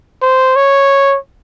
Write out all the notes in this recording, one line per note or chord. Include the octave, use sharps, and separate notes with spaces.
C5
C#5